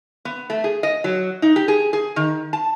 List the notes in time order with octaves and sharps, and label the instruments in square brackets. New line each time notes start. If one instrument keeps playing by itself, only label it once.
[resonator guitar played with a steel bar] B3
A3
G#4
D#5
F#3
D#4
G4
G#4
G#4
D#3
A5